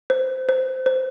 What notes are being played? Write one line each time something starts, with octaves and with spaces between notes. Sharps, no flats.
C5
C5
C5